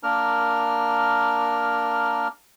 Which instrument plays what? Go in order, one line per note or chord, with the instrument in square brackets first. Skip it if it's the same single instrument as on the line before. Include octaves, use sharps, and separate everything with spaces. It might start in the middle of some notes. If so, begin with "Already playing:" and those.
[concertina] A#3 D4 A#4 F6